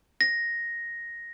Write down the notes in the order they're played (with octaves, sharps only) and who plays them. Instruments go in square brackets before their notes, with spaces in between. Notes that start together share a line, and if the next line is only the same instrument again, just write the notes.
[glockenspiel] A#6